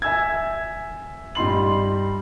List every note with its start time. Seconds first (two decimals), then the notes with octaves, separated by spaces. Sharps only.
0.02 E5 G#5 E6 G#6
1.35 G2 D#4 C6 F#7